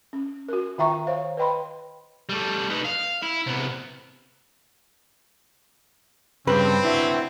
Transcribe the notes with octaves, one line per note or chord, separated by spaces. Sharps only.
C#4
F#4 A#4
D#3 F4 E5 G5 A#5 C#6
C5 C#5 F5
B4 D#5 G5 B5 C6
G3 A3
D#4 B4
F5
E4
C3 B3
G2 C#3 C4 B4
D4 E4 F#4